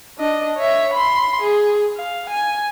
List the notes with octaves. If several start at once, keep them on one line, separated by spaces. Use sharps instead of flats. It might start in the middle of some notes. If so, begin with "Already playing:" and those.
D4 D#5
C#5 E5
B5 C6
G#4
F5
G#5